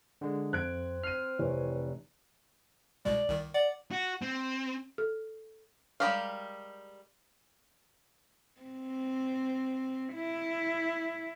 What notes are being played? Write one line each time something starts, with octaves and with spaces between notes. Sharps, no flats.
D3 G#3
F2 C4 F#6 G#6 D7
F6 C7 D#7
F1 E3 C#5
C2 B2 G#3 D5
C2 D#3
D5 F#5
F#4
C4
A4
G3 G#3 G4 A#4 F5
C4
E4